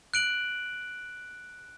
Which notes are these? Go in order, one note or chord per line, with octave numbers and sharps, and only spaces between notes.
F#6 D7 F#7